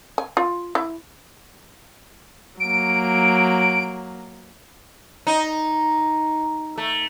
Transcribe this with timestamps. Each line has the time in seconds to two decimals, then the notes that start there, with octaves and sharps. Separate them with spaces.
0.18 G#5
0.37 F4
0.75 E4
2.60 F#3 A#3 D7
5.27 D#4
6.78 A3